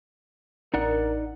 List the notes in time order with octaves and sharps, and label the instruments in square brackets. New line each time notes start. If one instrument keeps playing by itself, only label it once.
[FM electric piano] A1 D4 [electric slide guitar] D#4 D5 F#5 [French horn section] A#4